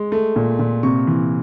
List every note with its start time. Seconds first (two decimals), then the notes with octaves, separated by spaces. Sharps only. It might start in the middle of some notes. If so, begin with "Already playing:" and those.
Already playing: G#3
0.12 A3
0.36 A#2
0.59 A#2
0.83 C3 C#6
1.07 E3